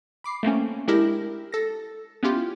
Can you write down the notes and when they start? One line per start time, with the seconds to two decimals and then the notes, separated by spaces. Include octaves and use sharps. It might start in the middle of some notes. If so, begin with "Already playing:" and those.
0.24 B5 D6 C7
0.43 A3 A#3 C4 C#4
0.88 G#3 D4 E4 G4 A#4 A#6
1.53 A4 A#6
2.23 B3 C#4 E4 F4 G4